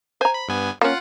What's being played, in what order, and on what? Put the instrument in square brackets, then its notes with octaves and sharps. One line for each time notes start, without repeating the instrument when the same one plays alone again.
[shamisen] C5 A#5 [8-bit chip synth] G#5
[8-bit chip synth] B5
G2 B3 G#5
[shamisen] A#3 C#4 [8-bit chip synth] F4 F#5